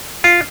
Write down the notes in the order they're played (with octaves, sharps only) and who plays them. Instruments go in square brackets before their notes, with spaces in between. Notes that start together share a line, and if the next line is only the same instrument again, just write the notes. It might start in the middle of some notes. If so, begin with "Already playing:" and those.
[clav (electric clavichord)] F4